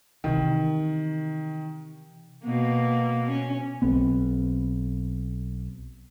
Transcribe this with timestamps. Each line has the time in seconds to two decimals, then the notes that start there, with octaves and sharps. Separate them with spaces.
0.24 C3 D#3 E3
2.44 B2 A#3
3.30 C#4
3.82 B1 B3 C4